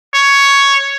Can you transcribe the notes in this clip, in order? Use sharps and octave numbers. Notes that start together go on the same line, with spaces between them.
C#5